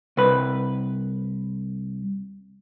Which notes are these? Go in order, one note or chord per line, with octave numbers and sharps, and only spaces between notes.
C2 B4